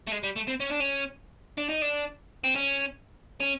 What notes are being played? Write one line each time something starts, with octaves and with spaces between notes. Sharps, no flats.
A3
G#3
G3
A3
C4
C#4
D4
C#4
D4
D#4
D4
C4
C#4
C#4